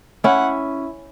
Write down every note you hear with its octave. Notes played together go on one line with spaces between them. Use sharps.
C#4 E4 F#5